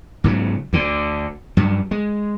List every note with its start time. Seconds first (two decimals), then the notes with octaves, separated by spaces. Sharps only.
0.24 G#2 C#3 E3 F#3
0.73 D2 D3
1.57 G2 F#3
1.91 G#3